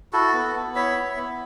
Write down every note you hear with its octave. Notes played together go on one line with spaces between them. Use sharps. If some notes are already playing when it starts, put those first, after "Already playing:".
E4 F#4 A4
B3
B3
E4 C#5 E5
E4
B3